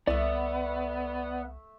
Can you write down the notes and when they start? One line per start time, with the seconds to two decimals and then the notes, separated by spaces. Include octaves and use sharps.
0.07 C2 A3 B3 D5 E5